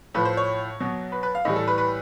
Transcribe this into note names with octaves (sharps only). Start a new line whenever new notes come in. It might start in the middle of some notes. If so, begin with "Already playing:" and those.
A2 F3 B4
C5
C#5
B2 F#3
B4
B4
F5
A2 E3 G3 D#5
A4
B4
B4